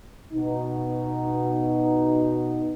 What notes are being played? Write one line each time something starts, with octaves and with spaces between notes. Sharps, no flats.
B2 D#4